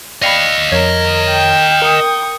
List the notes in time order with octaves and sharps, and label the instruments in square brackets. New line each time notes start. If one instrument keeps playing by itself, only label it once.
[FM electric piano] D5 G5 B5 [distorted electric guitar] D#5 F5 [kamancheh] C#6
[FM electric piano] F2 C#5 G#6 [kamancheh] A#4
[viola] G5
[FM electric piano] A#4 [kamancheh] C#6 D#6